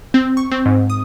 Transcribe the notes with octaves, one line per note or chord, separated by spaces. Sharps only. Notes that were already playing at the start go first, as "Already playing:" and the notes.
C4
C#6
C4
G#2
D#6